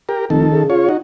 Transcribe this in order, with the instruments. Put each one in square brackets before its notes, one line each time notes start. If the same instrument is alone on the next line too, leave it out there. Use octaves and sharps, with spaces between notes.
[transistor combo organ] G4 A#4
[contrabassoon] F1 [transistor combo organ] D#3 A4
[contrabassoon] C#3
[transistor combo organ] F4 C#5
D#4 F#4